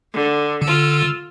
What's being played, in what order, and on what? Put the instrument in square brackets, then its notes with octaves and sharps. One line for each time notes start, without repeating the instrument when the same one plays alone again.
[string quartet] D3
[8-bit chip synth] D3 [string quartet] F4 E6